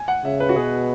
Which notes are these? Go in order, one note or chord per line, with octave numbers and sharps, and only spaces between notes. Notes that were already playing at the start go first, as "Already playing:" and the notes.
Already playing: G#5
F#5
C#3 E5
B4
F#4
B2 G#4